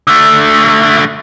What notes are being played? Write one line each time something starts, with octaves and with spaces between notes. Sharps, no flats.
D3 A3